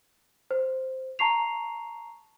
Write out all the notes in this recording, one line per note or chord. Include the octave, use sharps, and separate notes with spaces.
C5
A5 A#5 C#6 C7 F7